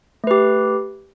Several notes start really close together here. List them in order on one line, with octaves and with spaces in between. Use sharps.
A3 B4 G4